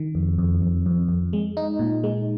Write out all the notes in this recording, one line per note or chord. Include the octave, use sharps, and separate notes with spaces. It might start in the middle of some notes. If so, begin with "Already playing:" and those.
Already playing: D#3
F2
F2
F2
F2
F2
G#3
D#4
A#2
G#3